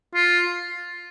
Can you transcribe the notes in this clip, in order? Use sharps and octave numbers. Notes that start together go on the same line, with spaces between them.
F4